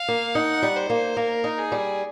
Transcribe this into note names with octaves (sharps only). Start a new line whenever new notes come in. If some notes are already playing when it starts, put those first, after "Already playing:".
Already playing: F5
A#3
D#4 F#5
G3
C5
A#3
A#3 A#4
D#4
G#4
G3